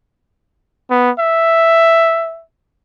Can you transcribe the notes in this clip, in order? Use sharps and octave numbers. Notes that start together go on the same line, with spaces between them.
B3
E5